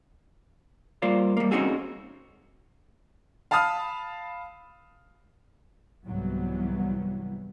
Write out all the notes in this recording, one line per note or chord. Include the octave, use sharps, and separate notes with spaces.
G3 A#3 F4 C5 D5
G3 A#3
C4 C#4 D#4 F#4 G#4 A4
F5 A5 B5 D#6 F6
C2 G#2 E3 F#3 G3 B3